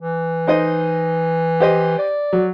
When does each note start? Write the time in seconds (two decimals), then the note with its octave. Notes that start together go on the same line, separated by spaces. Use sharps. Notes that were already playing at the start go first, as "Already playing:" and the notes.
0.02 E3
0.47 D#4 C5 D#5
1.60 G4 C5 D#5
1.98 D5
2.33 F#3